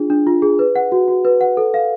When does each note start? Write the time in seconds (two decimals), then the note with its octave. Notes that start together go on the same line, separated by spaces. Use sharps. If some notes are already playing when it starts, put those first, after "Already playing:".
Already playing: D4 F4 G#4
0.10 D4
0.27 F4
0.42 G#4
0.59 B4
0.76 F#5
0.92 F#4
1.08 F#4
1.25 B4
1.41 F#5
1.57 A4
1.74 F5